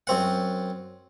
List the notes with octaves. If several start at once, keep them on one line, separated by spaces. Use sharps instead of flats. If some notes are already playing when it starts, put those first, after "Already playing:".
F#2 C4 F#5